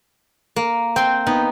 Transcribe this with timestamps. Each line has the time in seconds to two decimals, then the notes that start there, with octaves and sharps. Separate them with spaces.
0.56 A#3
0.96 C4 G5 C6
1.27 B3 D#4